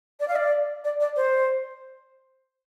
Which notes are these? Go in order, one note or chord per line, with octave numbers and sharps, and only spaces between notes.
D5
F5
D5
D5
D5
C5